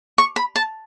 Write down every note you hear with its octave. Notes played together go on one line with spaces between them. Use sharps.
C#6
B5
A5